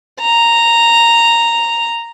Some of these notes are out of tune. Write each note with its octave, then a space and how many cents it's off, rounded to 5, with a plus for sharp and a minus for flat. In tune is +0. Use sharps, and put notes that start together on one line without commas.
A#5 -5